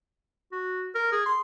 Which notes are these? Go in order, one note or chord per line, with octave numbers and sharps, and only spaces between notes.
F#4
A#4
G#4
C6